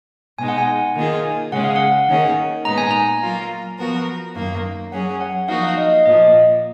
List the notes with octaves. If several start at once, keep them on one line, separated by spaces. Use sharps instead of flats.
B2 G#3 D#4 G#5
F#5
G#5
D#3 A#3 F4 G#4
C#3 G#3 C#4 G#4 F#5
F5
F#5
D#3 A#3 C#4 G#4
A#2 G#3 B3 D#4 A#5
G#5
A#5
F#3 A#3 F4
F3 B3 F#4 A#4
F#2 D#3 A#3
F#3 C#4 G#4 F#5
F#5
F3 A#3 D#4 F#4 A#4 F5
F5
D#5
F5
A#2 F3 A#3 D#5